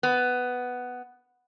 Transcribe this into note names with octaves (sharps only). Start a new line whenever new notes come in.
B3